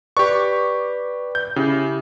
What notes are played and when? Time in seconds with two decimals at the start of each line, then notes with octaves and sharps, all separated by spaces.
0.17 G4 B4 D5 C#6
1.35 G6
1.56 C#3 E4 G4